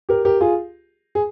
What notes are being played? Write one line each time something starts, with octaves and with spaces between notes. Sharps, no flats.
G4 A#4
G4 A#4
F4 G#4
G#4